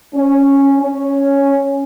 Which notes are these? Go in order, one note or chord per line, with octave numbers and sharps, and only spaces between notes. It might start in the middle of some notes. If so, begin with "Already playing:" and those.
C#4
C#4